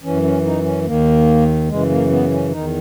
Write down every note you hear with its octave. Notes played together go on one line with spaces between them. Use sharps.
F#2 E3 C#4
C#4
D#4
C#4
D#2 D#3 A#3
F#2 C#3 E3 G#3
A#3
B3
C#4
E2 D#3 D#4